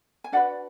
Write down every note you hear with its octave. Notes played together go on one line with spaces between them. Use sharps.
G#5
D4 F#4 B4 D5 F#5